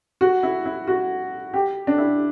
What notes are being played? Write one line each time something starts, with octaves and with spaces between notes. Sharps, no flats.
F#4
E4
E4
F#4
G4
D4
E4